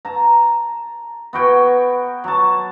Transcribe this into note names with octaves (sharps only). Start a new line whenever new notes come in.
A5 A#5
B3 F#4 G5 G#5
F#3 A5